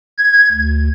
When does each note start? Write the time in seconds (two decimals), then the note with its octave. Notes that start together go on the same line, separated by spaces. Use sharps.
0.18 G#6
0.52 D2